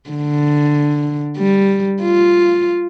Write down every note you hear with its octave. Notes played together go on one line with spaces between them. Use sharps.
D3
G3
F4